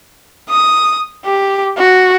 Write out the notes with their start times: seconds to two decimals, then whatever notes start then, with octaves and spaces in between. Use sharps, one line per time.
0.50 D#6
1.25 G4
1.78 F#4